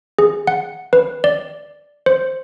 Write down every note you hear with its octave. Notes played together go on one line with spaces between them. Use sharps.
G#4
F#5
B4
D5
C5